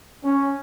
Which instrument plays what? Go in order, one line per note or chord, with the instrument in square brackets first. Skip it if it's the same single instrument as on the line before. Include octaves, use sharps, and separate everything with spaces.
[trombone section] C#4